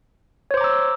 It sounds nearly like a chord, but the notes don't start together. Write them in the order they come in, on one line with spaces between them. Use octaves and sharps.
C#5 C5 D6 A#5 E6